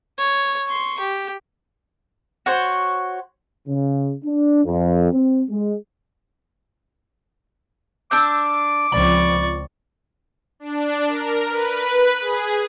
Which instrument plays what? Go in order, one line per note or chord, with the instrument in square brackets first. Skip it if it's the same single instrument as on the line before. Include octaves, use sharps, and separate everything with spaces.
[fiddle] C#5
C6 C#6
G4
[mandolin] F#4 C5 C#5
[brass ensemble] C#3
D4
F2
C4
G#3
[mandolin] D4 E6 G6 [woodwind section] D6
[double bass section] C#2 F3 C4 [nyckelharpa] D5 C#6 [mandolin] B5
[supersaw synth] D4
A#4
B4
G#4